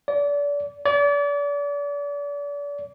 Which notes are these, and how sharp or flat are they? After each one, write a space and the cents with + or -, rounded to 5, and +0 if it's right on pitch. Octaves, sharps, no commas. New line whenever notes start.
D5 -30
D5 -35